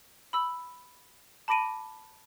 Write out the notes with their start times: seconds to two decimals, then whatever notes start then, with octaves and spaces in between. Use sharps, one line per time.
0.33 B5 E6
1.48 A5 B5 D6 A#6 D7 D#7